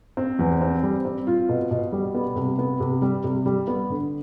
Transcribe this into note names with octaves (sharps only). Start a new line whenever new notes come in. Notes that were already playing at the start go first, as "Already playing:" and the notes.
C4
E2
C4
G3
C4
F4
B2
B2
G3
B3
C3
B3
C3
G3
C3
G3
B3
D3